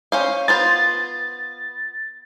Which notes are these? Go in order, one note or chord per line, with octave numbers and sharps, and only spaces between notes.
C#4 C5 F5
B3 F4 C5 A6